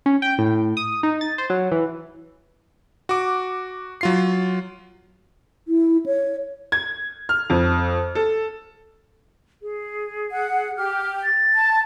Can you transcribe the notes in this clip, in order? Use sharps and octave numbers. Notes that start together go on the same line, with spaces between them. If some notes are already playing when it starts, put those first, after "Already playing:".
C#4
G5
A2
D#6
D#4
A6
C5
F#3
E3
F#4 D6
F#3 F4 C7
E4
C#5
G#6
F6
F2
A4
G#4
F#5
G4 F6
A6
A5